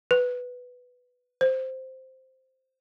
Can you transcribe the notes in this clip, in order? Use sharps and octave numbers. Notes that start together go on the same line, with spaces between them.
B4
C5